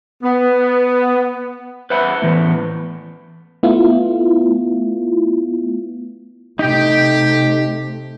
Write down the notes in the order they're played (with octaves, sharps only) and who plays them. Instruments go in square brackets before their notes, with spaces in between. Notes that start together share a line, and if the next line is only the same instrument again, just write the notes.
[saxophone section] B3
[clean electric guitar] B4 C5 E5 F#5 B5
A2 E3 B3
[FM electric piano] A3 B3 E4 F4
[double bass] C3 A3 [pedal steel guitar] D#4 G5 [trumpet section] G4